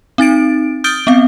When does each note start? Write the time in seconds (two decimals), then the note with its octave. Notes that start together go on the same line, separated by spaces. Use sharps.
0.18 C4 D#4 A6 D7
0.84 D#6 F6 G6 A6 D7 G7
1.07 B3 C4 F5